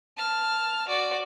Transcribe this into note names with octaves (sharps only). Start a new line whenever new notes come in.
A5 F6
F#4 D5